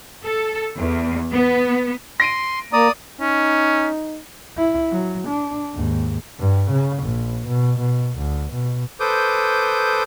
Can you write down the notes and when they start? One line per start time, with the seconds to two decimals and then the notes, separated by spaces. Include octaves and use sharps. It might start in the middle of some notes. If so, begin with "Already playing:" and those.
0.25 A4
0.78 E2
1.32 B3
2.20 C6 A#6 D7 D#7
2.73 A#3 D5 A#5 D#6
3.21 C#4 D#4
4.58 E4
4.92 F#3
5.28 D4
5.74 D#2 G#2
6.39 G2
6.71 C#3
7.03 A#1
7.47 B2
7.79 B2
8.18 D2
8.53 B2
9.00 A4 B4 C5 D6 D#6 G6